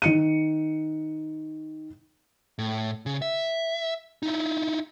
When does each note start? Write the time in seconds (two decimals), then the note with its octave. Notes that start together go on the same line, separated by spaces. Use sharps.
0.02 D#3 C#7 D#7
2.59 A2
3.06 C#3
3.22 E5
4.23 D#4 E4